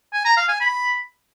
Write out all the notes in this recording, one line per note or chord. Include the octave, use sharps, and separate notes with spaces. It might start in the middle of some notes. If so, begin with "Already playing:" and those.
G#5
A#5
F5
G#5
B5